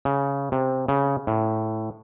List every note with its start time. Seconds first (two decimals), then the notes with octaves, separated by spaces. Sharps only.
0.05 C#3
0.52 C3
0.88 C#3
1.27 A2